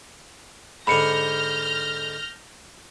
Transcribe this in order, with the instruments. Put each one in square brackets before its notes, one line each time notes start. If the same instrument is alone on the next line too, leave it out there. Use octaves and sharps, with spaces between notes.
[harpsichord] G#2 D3 [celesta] B5 C#7 [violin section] F6 G6 A#6